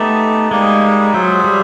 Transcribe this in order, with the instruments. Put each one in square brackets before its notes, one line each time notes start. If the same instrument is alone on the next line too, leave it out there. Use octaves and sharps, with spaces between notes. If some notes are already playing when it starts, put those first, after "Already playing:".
Already playing: [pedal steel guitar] A3 [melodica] B3 D#4 G4
[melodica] G3 A#3 D#4 G4 [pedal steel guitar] G#3
[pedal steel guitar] F#3 [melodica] F4 G#4 C5 E5
[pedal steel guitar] G3